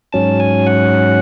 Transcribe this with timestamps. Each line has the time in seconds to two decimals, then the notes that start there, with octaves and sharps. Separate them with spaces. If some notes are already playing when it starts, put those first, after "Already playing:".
0.13 G#2 F#3 C#4 A5
0.40 G#5
0.66 F#5